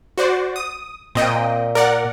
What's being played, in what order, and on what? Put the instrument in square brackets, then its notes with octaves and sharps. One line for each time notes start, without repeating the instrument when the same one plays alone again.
[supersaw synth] F#4 C5 D5
D#6
[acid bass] A#2 [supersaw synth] C4 D#5 G5
[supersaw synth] A#4 D5 F#5